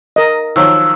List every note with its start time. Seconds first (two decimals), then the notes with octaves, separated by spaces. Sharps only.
0.16 A#4 D#5
0.56 D#3 F3 F#3 E6